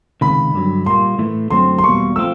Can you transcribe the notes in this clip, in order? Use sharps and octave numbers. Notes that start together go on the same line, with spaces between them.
C#2 C3 D#3 B5
G2 D3 F#3
A#2 G3 A#3 C6
A2 E3 A3
F#2 D3 F#3 A3 C4 C6
C6
E2 B2 G3 A#3 C#6
F3 A3 C4 F4 E6